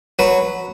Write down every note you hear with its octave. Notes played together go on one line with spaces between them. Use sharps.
F#3 B4